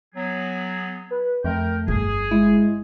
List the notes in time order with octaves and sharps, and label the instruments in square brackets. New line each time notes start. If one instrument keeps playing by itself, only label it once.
[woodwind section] F#3 B3 G#4
[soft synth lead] B4
[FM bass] F2 [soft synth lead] A3 [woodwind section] A#4 G5
[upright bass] G1 [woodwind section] G#4
[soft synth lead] G#3 [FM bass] E4